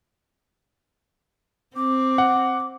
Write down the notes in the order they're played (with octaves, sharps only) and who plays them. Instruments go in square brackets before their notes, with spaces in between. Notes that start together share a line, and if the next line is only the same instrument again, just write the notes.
[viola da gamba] C4 [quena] D6
[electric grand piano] F#5